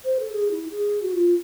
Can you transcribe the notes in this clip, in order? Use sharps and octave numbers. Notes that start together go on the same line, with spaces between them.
C5
A4
G#4
E4
G#4
F#4
F4